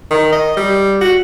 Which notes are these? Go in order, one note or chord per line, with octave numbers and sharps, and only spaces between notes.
D#3
D#5
G3
F#4